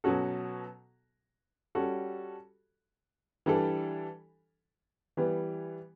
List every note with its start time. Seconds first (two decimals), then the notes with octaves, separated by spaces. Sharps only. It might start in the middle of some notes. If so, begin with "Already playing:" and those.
0.04 B2 F#3 C#4 F#4 A4
1.75 G3 C#4 F#4 A4
3.46 E3 G3 D4 A4
5.17 E3 G3 B3